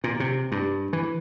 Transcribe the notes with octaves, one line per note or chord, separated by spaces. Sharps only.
A#2
C3
G2
E3